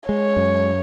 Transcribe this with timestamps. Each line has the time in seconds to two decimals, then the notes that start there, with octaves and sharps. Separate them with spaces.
0.09 G#3 C#5
0.36 F#2